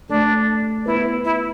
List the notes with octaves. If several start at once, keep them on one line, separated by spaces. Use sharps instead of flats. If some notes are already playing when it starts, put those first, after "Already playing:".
A3 D4
B3 E4
E4